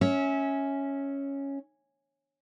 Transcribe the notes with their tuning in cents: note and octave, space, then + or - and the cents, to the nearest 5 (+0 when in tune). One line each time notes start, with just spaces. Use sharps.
C#4 +0 E5 -25